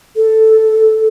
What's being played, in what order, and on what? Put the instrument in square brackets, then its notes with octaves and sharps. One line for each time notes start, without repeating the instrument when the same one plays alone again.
[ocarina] A4